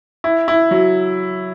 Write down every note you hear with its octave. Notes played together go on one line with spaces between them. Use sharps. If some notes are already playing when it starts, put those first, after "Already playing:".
E4
E4
F#3